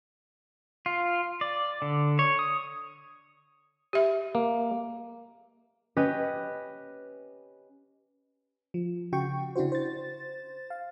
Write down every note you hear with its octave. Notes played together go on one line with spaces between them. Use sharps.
F4
D5
D3
C#5
D#6
G4 E5
A#3
C#4 G4 B4 D#5
F3
C#3 F#4 G5 C#6
C#3 D4 E4 F#4 C5
C5 A6
F5